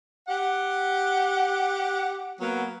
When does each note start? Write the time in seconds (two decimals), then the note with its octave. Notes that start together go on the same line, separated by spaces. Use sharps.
0.27 G4 F#5
2.40 F#3 A#3 B3